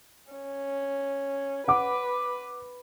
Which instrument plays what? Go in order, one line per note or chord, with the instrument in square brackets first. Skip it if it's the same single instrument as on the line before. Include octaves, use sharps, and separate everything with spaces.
[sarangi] C#4
[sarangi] B4 [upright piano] F#5 D6